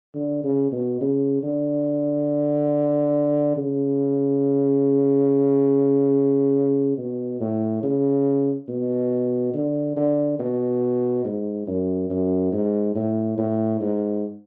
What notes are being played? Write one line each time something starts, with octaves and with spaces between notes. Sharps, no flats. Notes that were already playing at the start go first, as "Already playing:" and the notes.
D3
C#3
B2
C#3
D3
C#3
B2
A2
C#3
B2
D3
D3
B2
G#2
F#2
F#2
G#2
A2
A2
G#2